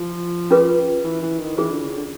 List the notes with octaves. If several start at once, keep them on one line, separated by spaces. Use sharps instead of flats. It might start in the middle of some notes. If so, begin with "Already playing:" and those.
Already playing: F3
C#4 F4 G#4 B4
E3
E3
D#3
E3 C#4 F4 G#4 C5
D3
C#3
D3